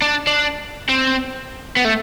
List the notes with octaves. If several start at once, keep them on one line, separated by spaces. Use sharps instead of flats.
D4
D4
C4
B3
A3